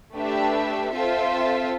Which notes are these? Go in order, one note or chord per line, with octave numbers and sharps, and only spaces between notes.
A3 D4 G4 B4 E5
C4 F4 A4 C5 E5